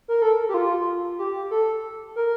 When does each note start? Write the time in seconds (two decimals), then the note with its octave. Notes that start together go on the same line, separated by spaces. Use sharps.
0.08 A#4
0.22 A4
0.49 G4
0.54 F4
1.19 G4
1.51 A4
2.16 A#4